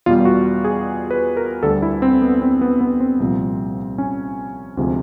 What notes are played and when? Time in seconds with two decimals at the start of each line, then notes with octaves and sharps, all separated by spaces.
0.06 E2 B2 G3 F4
0.25 F#4
0.64 G#4
1.11 B4
1.37 A#4
1.63 D2 D3 G3 A4
1.82 E4
2.02 C4
2.22 B3
2.42 C4
2.61 B3
2.81 B3
3.00 C4
3.20 C2 A#2 F3
3.98 C#4
4.77 D2 C3 F3 G#3